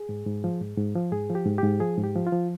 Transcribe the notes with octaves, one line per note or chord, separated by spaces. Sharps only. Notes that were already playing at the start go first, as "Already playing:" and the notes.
Already playing: G#4
G#2
G#2
F3
G#2
G#2
F3
G#2 G#4
F3
G4
G#2
G4
G#2
F3 G#4
G#2
G4
F3
F4
F3